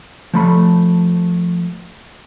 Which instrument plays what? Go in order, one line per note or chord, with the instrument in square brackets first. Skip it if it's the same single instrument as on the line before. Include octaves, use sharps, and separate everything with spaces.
[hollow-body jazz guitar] F3 A3 B5